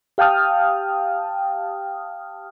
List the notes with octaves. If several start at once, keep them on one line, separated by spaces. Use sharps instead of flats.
G4 F5 G5 A5 D#6 F6